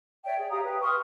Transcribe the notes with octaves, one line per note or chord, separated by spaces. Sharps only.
C#5 D5 E5 G5
G#4
G4 F5 A#5 D#6
B4 G5
C6 C#6 D#6 F6